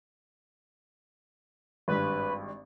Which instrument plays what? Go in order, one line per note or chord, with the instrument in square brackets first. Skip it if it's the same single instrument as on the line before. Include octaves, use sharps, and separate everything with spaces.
[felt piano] G#1 G2 [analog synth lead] B4